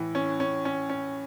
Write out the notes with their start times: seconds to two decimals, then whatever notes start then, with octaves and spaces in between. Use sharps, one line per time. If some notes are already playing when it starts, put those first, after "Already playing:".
Already playing: A2 E3
0.15 C#4
0.40 C#4
0.65 C#4
0.90 C#4